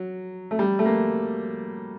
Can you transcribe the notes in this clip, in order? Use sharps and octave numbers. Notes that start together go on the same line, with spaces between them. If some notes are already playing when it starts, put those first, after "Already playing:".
Already playing: F#3
A3
G3
A3
A#3